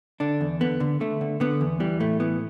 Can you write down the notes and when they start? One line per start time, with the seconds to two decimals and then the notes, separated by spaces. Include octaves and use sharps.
0.20 D3 D4
0.41 E2
0.61 D3 B3
0.80 D3
1.00 D3 A3
1.21 D3
1.40 D3 B3
1.61 E2
1.80 E3 G3
2.00 A2 A3
2.20 E3 B3